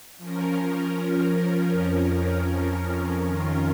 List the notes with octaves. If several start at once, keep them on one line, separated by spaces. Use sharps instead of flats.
F3 C#4 A#4
F2 F3 C#4 A#4
F2 D#3 C#4 F4 A#4